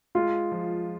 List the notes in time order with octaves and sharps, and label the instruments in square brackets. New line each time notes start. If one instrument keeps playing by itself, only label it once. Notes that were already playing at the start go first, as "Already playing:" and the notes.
[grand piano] G#3 [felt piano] F4
[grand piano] F3